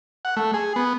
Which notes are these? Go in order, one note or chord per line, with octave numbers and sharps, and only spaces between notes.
F#5
A3
G#4
B3